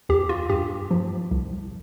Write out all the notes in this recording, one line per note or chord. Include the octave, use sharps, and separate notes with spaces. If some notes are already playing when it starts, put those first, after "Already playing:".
E2 G4
F4
G2 G4
F3
C2